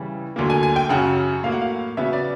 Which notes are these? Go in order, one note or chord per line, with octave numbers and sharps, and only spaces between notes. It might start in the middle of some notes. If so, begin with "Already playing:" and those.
Already playing: C#3 E3 G3
D2 D3 F#3 A#3
G#5
G#5
G5
F#2 C#3 F#3 F#5
A2 F#3 A#3 F5
F#5
F5
C#3 F#3 B3 E5
D5